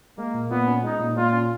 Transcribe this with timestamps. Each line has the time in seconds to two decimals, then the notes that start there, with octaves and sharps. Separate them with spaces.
0.18 G#3 A#3
0.34 A#2
0.51 A#2 B3
0.67 C#4
0.84 G#3 D#4
1.00 A#2
1.17 A#2 F4
1.33 C#4